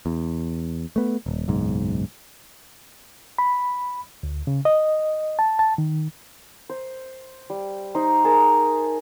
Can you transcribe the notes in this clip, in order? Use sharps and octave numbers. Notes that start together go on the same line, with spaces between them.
E2
A3 B3
D#1
F#1 B1 G#2
B5
D2
C#3
D#5
A5
A5
D#3
C5
G3
D#4 C5
G#4 A#4 A5